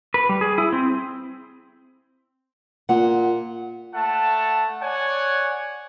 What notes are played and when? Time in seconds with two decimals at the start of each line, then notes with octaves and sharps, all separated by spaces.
0.14 B4
0.29 G3
0.41 G#4
0.58 E4
0.73 C4
2.89 A#2 F#5
3.94 A3 F#5 A5
4.82 C#5 D5 F#5 G#5